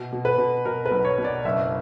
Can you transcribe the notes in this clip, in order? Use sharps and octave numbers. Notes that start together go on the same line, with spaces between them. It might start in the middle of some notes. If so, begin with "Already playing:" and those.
Already playing: B2
B2
B4
B2
B2 A#4
B4
B1
C#5
B2
D5
F#1 E5